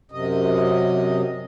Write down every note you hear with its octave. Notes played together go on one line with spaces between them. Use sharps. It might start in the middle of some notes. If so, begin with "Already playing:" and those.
F#2 C3 D#5